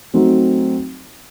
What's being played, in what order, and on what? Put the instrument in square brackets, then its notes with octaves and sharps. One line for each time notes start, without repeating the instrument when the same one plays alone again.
[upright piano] F#3 A3 C4 D#4 F#4